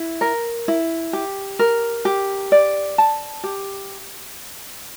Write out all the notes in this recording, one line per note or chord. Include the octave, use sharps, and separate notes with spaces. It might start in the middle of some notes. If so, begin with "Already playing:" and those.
Already playing: E4
A#4
E4
G4
A#4
G4
D5
A5
G4